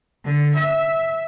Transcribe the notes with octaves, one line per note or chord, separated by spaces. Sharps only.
D3
E5